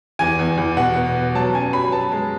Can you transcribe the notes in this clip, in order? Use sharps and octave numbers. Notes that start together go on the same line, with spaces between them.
E2 G#5
E2
E2
B2 F#5
B3
B3
F#3 A5
C#4 G#5
F#3 B5
B3 A5
G#3